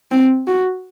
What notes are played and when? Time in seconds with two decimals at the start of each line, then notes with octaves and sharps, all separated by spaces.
0.11 C4
0.47 F#4